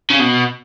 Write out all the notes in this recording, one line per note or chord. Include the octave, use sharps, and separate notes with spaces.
C#3
B2